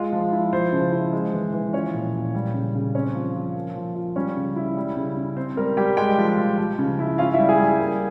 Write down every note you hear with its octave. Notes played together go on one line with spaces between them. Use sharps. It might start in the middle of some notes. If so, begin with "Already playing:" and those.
Already playing: G#3 F4
F3
E4
F3 C5
C#3
E4
G#3
E3
E3
F3 C#4 C#5
A#2
A#2
G3
C#3
C#3
C4 C#4 C#5
F3
F3
A#3
F3
F4
G3 C#4 C#5
C#3
E4
G3
C#3
C#3
C4 C5
G3 A#4
G3 G4 G5
G#3 G4 G5
F3
F3
F3
C#3
E4
C#4 F4 F5
E4 E5
G3
G#4 G#5
G3 G#4 G#5
A#3